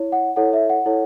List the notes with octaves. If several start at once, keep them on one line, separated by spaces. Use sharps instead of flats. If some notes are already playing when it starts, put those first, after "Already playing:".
Already playing: E4 C#5
F#5
E4 A4 C#5 F#5
E5
F#5
E4 A4 C#5